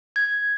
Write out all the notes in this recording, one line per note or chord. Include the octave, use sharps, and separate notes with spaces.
G#6